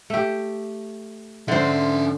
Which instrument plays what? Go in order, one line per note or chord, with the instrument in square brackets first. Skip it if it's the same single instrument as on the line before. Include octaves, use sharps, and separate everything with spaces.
[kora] A3 G4
[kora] D3 C5 [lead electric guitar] C#4 E5